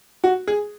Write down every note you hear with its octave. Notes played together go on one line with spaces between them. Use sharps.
F#4
G#4